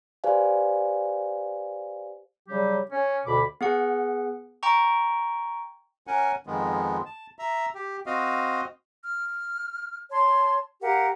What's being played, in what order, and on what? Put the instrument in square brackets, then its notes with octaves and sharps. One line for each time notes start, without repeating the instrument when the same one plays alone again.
[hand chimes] G4 B4 C5 D5 F5 G#5
[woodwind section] C#3 F#3 G3 G4
C#4
D2 B2 B5 D6
[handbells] B3 G#4 F#5
G5 A#5 C#6
[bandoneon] C#4 A#4 F#5 G#5
F2 D#3 G#3 B3
A5
E5 A#5
G4
C4 F#4 D#5 F5
[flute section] F6
C#5 A5 C6
G4 A#4 F5 F#5